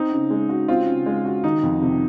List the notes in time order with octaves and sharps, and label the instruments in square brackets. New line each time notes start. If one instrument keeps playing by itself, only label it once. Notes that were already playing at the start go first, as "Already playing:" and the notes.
Already playing: [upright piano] C4 [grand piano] D#4
[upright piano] C#3
G#3
F#4
[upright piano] C4 [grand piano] F4
[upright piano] C#3
G#3
F#4
[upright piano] D#3 [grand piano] D#4
[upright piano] F2
C3